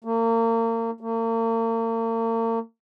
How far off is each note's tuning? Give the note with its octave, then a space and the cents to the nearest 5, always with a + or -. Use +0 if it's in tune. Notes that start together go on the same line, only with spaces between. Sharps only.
A#3 -35
A#3 -40